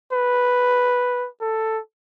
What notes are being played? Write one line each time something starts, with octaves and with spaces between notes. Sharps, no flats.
B4
A4